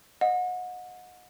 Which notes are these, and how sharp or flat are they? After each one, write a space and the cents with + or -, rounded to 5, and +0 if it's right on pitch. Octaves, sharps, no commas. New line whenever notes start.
D#5 +0 F#5 -30